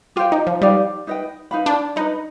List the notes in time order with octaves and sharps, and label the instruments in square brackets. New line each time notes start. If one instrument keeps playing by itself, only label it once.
[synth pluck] F4 [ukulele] G4 C5 G5
[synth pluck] D#4
F3
[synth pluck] G3 [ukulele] D#4 B4 D5 F5
[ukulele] D#4 B4 D#5 G5
D#4 B4 F5 B5
[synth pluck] D4
[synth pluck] D#4 [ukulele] B4 D#5 B5